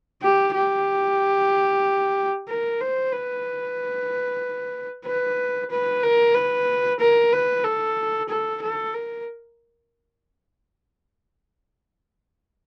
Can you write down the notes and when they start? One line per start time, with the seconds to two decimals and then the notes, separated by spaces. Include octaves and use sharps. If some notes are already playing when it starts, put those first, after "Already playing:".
0.22 G4
0.55 G4
2.48 A#4
2.81 C5
3.13 B4
5.06 B4
5.71 B4
6.03 A#4
6.35 B4
7.00 A#4
7.33 B4
7.64 A4
8.29 A4
8.62 A4
8.94 A#4